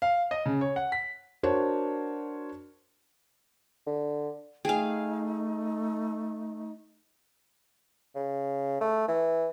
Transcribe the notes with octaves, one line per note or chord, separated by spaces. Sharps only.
F5
D#5
C#3
C#5
F#5
B6
D4 F#4 A#4 C5 C#5
D3
A3 D#4 G#4 F5 G5 G#5
C#3
A3
E3